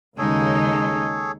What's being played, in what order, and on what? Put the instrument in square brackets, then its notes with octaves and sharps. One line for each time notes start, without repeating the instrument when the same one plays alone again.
[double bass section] D#2 C#3 [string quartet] G#3 D#4 [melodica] G#4 A4 C#5